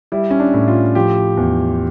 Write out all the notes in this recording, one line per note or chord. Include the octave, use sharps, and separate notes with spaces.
G3 E4
C#4
D4
A2
F4
F3 G4
E2